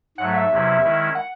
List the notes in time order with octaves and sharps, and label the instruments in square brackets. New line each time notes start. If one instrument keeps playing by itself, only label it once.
[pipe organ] G#2 F#3 A3 [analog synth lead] F#5
[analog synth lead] E5
[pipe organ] E2 C3 F#3 C#4 E4
D#3 G#3 C#4 E4
[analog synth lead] F#5